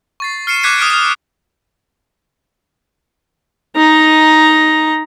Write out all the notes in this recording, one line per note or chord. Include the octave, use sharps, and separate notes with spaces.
C#6 A6 C7
F6 C7 C#7 D#7 E7
D6 F#6 G#6 B6 C#7 D#7
D#6 F6 B6 D7
D#6 F6
D#4 A#5